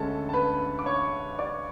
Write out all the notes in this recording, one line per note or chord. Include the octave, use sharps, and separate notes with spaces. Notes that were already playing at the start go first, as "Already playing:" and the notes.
Already playing: D2 D3 G#3 C#4 A4 A5
A5
B4 B5
D6
C#5 C#6
D5 D6